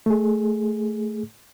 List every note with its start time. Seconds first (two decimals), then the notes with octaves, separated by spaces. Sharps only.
0.06 A3 G#4